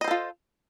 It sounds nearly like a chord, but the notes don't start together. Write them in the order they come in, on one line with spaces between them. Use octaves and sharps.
D#5 C5 A4 F4